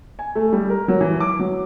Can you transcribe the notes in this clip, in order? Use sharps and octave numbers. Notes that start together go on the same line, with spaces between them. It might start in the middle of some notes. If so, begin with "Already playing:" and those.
G#5
A3
G3
A#4
F#3
E3
D6
F#3